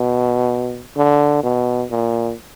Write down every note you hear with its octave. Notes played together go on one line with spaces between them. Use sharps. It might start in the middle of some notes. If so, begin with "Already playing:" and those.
Already playing: B2
D3
B2
A#2